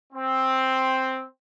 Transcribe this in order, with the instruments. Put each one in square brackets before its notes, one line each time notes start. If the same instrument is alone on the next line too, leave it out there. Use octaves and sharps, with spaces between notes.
[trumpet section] C4